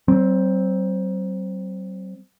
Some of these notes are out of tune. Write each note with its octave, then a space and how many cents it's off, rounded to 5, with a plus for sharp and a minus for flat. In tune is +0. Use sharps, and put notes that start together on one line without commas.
F#3 +45 C4 +0